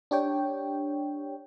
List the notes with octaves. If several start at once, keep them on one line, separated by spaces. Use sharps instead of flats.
D4 G4 C#5 G5